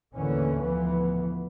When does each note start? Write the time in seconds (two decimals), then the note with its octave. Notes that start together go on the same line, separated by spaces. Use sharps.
0.15 D#2 A2 D3 E3 C#4
0.60 D2 E3 F3 B3